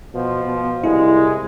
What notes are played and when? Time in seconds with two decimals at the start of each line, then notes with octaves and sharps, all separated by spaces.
0.14 B2 F3
0.45 B2
0.84 C2 G#3 E4